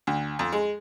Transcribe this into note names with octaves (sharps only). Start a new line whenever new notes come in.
D2
F2
G#3